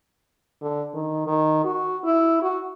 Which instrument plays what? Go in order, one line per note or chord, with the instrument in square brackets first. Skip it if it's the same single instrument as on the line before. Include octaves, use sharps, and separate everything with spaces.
[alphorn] D3
D#3
D#3
F#4
E4
F#4